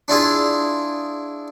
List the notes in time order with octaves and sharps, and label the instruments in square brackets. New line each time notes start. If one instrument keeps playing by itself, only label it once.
[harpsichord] D4 E4 F4 G#4